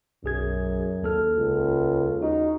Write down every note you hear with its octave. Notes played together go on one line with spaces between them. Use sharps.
B1 F#2 G#4 G#6
D#2 A4 F6
C#2
D#4 F#4